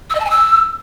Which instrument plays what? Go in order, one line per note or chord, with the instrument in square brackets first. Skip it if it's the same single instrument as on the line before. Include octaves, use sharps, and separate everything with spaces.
[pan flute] E6
D#5
A5
G#5
E6